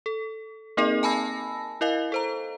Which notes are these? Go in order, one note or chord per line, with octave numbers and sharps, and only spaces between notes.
A4
A#3 C4 D#4 G#4 A#4 D#5
G#5 A5 B5 E6 A#6
E4 A#4 D#5 F5
A4 C5 A#5